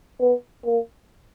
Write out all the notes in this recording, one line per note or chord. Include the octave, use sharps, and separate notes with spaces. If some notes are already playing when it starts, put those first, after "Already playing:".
B3
A#3